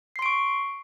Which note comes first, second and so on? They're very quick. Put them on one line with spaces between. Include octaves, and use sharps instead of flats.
C7 C6 D7 C#6